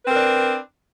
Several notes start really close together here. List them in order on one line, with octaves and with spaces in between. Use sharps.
B4 C4 A#4 D4